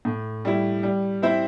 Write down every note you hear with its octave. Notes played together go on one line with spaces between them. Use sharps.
A2
G3 E4
G3
C4 E4 C5 E5